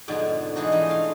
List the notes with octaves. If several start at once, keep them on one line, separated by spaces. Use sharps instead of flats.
F2 G#2 B2 D3 F3
E3 G#3 D4 D#4 F#4
E3 D#4 D#5
A3 F5 C6